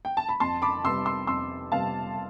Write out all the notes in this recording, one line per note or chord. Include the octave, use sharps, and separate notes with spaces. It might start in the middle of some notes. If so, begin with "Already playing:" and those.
G5
A5
B5
F2 A5 C6
B5 D6
C3 G3 B3 C6 E6
C6 E6
F2 C6 E6
C3 G3 B3 F5 A5